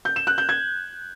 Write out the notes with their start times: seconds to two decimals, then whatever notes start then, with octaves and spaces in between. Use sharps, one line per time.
0.05 G6
0.16 E7
0.27 F#6
0.38 G6
0.49 G#6